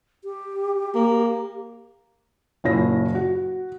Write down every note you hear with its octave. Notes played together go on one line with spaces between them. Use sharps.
G4
A#3
F#1 A#2 E4 C#5 A#6
F#4